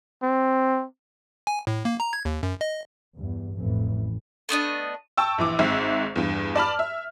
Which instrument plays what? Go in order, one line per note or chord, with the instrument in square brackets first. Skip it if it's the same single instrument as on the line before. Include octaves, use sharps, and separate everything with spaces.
[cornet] C4
[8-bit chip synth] G#5
A2
A#3
A#5
G#6
D#2
F#2
D#5
[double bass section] E2 G2
A1 F2 E3
[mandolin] A3 B3 D4 D#5
[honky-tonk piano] G5 A5 C#6 E6
A#1 E3 D6
G#1 G#2 C4 E5
E2 G2
D5 A5 B5 F6
E5